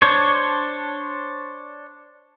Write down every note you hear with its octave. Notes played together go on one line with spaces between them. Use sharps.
D4 C5 C#5